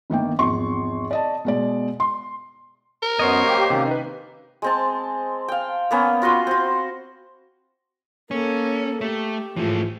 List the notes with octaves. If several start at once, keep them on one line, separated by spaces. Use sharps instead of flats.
G1 D#3 A#3 G5
G#1 E2 F3 C6 C#6
D5 D#5 A5
B2 G#3 D5
C6
A#4
F#2 B3 C5 C#5 D#5
A#3 G4
C3 D#3 C#4
D#4 B4
G#3 C4 A5
F5 G5
A#3 B3 C#4
F4 F#4 B4 C6
C4 F#4
A#3 C#4 A4
A3 G4
G#2 E3 F3 A3